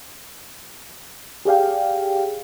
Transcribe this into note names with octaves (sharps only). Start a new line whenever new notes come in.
G4 G#4 D5 F5 G5